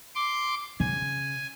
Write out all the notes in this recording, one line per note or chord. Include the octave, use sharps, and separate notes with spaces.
C6 D6
C#3 G#5